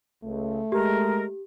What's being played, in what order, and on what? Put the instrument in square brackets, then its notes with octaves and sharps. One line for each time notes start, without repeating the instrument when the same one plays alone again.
[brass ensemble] C#2 [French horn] A3
[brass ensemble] G#3 [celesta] G4 [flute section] A#4